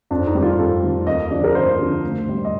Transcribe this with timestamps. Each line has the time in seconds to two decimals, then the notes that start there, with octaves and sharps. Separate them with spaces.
0.11 F2 D4
0.27 D#4
0.35 D#3 G3
0.43 F4
0.58 F2 A4
0.83 D#3 G3
1.07 D#2 D#5
1.31 D3 F3 D5
1.44 A#4
1.55 D#2 C5
1.79 D3 F3
2.03 D2
2.27 C3 G3
2.45 D#5